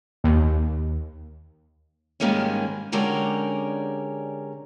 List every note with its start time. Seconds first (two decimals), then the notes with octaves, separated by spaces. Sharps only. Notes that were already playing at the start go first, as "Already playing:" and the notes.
0.24 D#2
2.20 G#2 D#3 G3 G#3 A#3 C#4
2.92 D3 G#3 C#4 G4 A#4 D5